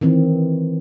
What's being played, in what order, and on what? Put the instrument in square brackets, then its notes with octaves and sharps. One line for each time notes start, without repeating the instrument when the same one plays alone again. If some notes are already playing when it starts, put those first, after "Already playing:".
[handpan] D#3 E3 C4